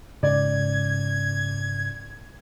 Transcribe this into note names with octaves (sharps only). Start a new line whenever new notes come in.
G#2 C#3 G#3 D5 G#6